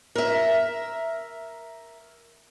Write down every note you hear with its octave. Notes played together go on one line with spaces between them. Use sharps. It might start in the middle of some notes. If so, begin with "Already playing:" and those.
A#4 E5